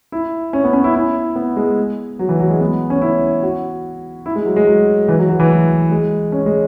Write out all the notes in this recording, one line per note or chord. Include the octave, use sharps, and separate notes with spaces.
E4
C#4
B3
C#4
E4
E4
B3
G#3
F#3
E3
F#3
G#3
B3
C#4
E4
F#4
E4
G#3
F#3
G#3
F#3
E3
F#3
F#3
E3
G#3
C#4
G#3